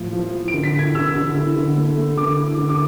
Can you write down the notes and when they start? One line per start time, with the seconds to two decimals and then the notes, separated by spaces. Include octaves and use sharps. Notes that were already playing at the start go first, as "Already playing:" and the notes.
Already playing: A2 F3
0.13 F3
0.33 E4
0.48 D7
0.54 D3
0.63 B6
0.74 E4 G#6
0.95 D3 E6
1.15 D3
1.35 E4
1.56 D3
1.76 A3
1.96 A3
2.17 D3 D6
2.37 E4
2.58 D3
2.69 D6